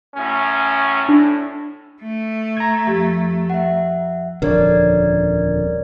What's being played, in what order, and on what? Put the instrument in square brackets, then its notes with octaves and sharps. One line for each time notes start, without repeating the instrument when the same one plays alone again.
[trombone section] F#2 A2 C#4
[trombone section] A2 [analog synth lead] D4
[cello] A3
[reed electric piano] A#5 G#6
[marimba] F2 F3 G4
[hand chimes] E5 F#5
[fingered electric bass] D#1 F2 D3 [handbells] A#4 C#5 D5